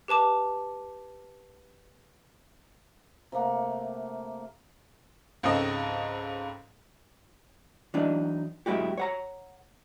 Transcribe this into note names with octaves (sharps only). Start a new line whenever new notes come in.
G4 B4 A5 D6
C3 A3 A#3 F#5
C#2 G#2 C#3 C4 A4 D#5
E3 F#3 D4 D#4
G#2 F#3 G#3 E4 F#4 G4
C#5 F#5 A#5